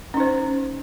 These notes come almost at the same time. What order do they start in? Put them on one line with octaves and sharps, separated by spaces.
C#4 D#4 C5